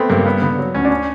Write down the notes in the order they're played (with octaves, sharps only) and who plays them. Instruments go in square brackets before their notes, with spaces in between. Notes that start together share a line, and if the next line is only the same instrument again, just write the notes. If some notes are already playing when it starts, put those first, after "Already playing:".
Already playing: [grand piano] A3 [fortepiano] B3 C4
[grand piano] G2 [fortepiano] A#3
[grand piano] A#3 [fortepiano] B3
[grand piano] D3 [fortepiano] B3
[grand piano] F#3
[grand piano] D2 [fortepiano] C#4
[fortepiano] D4
C#4